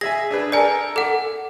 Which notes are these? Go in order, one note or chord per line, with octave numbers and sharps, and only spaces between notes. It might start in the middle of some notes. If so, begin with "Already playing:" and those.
G#4 E5 G#5 A#6
D4 G#4 B4
A4 A#4 D5 G#5
A4 F#5 D6